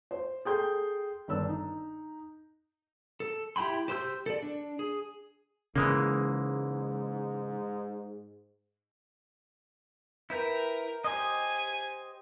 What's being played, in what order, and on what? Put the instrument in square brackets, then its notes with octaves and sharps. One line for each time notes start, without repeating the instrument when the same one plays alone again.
[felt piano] C5
G#4 A4 G5 C6 G6
G1 D#3 D4 E6
D#4
[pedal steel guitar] A4
E4 G4 G5 B5 C6
G4 C5 C6 E6 G6
A4 D5
D4
G#4
[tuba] G#2 [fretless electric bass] C#3 [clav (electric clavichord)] E3 G#3 A#3
[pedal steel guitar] E4 B4 G5 [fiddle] A#4
[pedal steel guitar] G4 C5 D#5 [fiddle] G#5